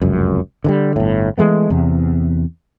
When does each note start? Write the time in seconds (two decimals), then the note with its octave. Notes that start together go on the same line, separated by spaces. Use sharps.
0.02 F1 C#2 F#2
0.64 D3 D#3 G3
0.96 G1 A2
1.38 E3 G#3 A3 B3
1.70 E2 C3